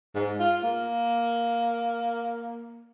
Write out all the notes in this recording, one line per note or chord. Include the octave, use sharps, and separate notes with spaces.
G#2
F4
A#3